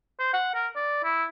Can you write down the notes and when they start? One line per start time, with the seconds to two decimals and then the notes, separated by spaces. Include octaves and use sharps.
0.19 C5
0.33 F#5
0.55 A#4
0.76 D5
1.04 E4